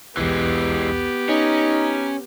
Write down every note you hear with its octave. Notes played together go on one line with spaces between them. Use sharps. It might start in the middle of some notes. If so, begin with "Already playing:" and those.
B1 E2 E3 G#3 B3 G4
C#4 D#4 A#5